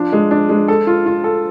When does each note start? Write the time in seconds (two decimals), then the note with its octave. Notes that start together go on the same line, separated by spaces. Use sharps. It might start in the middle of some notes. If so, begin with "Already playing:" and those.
Already playing: F3 D4
0.13 G#3
0.31 D4
0.49 G#3
0.68 A4
0.87 F4
1.06 F4
1.24 A4